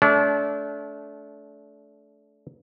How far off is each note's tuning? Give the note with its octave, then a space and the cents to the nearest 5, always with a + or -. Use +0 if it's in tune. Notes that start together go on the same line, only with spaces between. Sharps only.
A3 -25 D4 -35